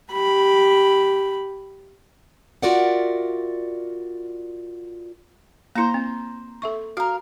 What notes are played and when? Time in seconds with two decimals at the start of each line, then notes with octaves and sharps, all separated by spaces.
0.13 G4 B5
2.62 F4 F#4 A#4 D5 E5 F#5
5.75 A#3 E4 C5 A#5
5.94 C4
6.62 A4 E5 C#6
6.97 F#4 A#4 F5